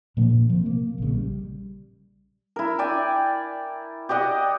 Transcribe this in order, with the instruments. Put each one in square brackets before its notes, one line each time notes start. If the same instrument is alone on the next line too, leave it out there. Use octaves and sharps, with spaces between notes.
[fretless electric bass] A#2 F3 A#3 D4
C3 F3
A#3
A#1 C#3
G3
[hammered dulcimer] E4 A#4
D5 G5 G#5
G4 D5 D#5 F#5